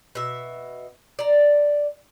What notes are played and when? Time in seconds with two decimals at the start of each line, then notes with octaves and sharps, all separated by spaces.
0.15 B2 E5
1.19 D5 A#5